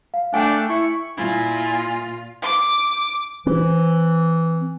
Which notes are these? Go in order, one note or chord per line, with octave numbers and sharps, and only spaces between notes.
F5
A3 D4 G5 G#5
E4 C#6
A#2 E4 F4 G#5
D6
E3 C4